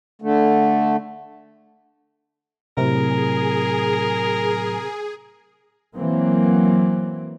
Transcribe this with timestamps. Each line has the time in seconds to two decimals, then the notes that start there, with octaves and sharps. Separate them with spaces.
0.22 D3 A3
2.77 A2 C3 F#3 G#4 A#4
5.95 E3 F#3 A#3 C4